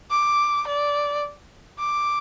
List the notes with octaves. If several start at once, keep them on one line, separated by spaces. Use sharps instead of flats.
D6
D5
D6